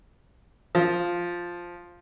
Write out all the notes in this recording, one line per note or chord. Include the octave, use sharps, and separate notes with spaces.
F3